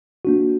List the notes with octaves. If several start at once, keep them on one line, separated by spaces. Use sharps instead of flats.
A#3 D4 F#4